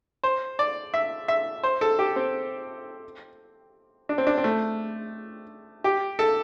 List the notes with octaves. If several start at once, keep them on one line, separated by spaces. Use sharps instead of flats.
C5
D5
E5
E5
C5
A4
G4
C4
D4
C4
D4
C4
A3
G4
A4